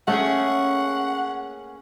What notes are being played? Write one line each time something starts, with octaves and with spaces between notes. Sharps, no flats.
A3 A#3 C#4 G#4 F#5